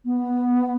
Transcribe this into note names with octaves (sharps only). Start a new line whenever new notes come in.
B3